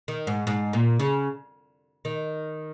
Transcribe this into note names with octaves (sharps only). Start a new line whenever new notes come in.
D#3
G#2
G#2
A#2
C#3
D#3